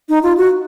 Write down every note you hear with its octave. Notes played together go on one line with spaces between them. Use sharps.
D#4
F4
F#4